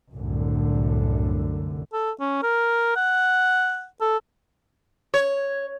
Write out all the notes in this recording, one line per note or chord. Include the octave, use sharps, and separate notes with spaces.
C2 F#2 A2 D3
A4
C#4
A#4
F#5
A4
C#5